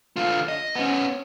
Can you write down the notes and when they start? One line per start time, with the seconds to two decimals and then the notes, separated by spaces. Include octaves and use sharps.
0.16 D3 F4
0.48 D#5
0.76 B3 C#4